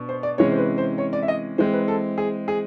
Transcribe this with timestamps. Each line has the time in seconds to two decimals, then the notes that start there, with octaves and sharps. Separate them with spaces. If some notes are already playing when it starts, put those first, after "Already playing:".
Already playing: B2 D4
0.09 C5
0.23 D5
0.38 C3 E3 G#3 C#4 C#5
0.51 C5
0.58 B4
0.78 C5
0.98 C#5
1.13 D5
1.22 E5
1.28 D#5
1.58 E3 G#3 C4 C5
1.73 B4
1.88 A4
2.18 G#4
2.48 G#4